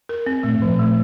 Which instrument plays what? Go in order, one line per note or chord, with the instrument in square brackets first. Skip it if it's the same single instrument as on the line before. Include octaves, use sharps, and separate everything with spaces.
[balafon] A#4
C4
[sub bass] A#2 [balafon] A3
[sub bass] A2
[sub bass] A#2 [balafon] F3
[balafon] A3